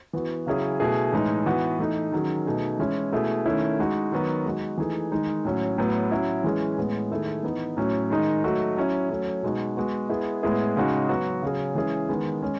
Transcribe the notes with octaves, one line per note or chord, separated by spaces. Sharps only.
E3 B3 F#4
C#3 F#3 C#4 E4 G#4
B2 A3 E4 G#4
A2 E3 G#3 D#4
E3 B3 F#4
E3 A3 D#4
D#3 F#3 C#4 G#4
B2 A3 D#4 G#4
E3 G#3 C#4 E4
B2 A3 E4 G#4
D#3 A3 C#4 E4
G#3 D#4 F#4
D#3 F#3 B3 F#4
G#3 D#4 F#4
E3 A3 D#4 G#4
D#3 G#3 D#4
A2 F#3 C#4
A2 F#3 B3
F#3 C#4 E4
E3 G#3 C#4 G#4
A2 G#3 B3
D#3 A3 E4 G#4
E3 B3 D#4
A2 F#3 C#4 F#4
D#3 G#3 D#4
F#3 A3 D#4 F#4
F#3 C#4 E4
F#3 A3 C#4
B2 G#3 D#4 F#4
G#3 B3 F#4
G#3 B3 E4 G#4
A2 G#3 B3 E4 G#4
C#3 G#3 D#4 F#4
F#3 B3 F#4
C#3 F#3 C#4 G#4
E3 G#3 C#4 E4 G#4
D#3 G#3 B3
G#3 C#4